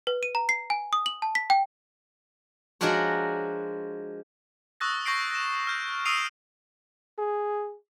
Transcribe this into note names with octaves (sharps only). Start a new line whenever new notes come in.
B4
D#7
A#5
C7
G#5
D#6
F#7
A5
B6
G5
F3 G#3 D4 F#4 A#4 C#5
C#6 D#6 E6 F#6 A6 A#6
C#6 G6 A#6 C7 D7
A#6 E7
F6 G6
D#6 E6 C7 D7 D#7 F7
G#4